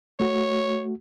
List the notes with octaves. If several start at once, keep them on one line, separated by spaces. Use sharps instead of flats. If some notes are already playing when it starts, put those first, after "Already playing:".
A3 F#4 C#5